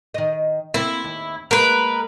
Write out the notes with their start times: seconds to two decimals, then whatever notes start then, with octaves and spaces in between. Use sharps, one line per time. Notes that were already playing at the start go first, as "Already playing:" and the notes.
0.14 D#3 D#5
0.74 A#3 C4 E4
1.04 D#2
1.51 G#3 A#3 A#4 B4